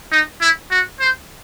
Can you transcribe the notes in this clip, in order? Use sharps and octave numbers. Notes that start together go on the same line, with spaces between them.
D#4
E4
F#4
C5